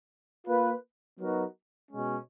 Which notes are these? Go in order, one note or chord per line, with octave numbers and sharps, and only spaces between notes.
A#3 F4 B4
F#3 B3 D#4 F#4 A#4
B2 G#3 C#4